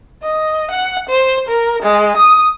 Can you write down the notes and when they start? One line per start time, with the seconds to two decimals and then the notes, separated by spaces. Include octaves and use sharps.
0.23 D#5
0.71 F#5
1.09 C5
1.48 A#4
1.83 G#3
2.17 D#6